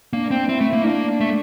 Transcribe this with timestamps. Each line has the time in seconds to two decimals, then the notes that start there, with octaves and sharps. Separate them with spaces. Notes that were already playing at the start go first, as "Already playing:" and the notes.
0.13 A#3 D4
0.31 C4
0.48 C4 E4
0.61 A3
0.73 A#3
0.85 D4
1.20 A3